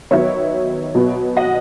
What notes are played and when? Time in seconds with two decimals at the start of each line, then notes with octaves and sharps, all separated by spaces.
0.11 D#3 F#3 B3 C#5 E5
0.95 B2 F#3 B3
1.37 D#5 F#5